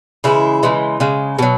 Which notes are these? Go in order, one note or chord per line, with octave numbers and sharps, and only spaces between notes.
C#3 E3 G#3 E4
C#3 E3 G#3
C#3 G#3
B2 F#3